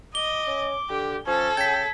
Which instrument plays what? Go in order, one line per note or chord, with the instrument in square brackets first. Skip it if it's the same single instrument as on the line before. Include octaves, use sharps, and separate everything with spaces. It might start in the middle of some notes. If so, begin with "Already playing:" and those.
[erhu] D#5 [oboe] D6 [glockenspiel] G7
[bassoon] C#4
[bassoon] D3 [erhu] G4
[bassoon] F3 [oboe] C#4 [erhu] A4
[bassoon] C#3 [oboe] G5 [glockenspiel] G#6 B6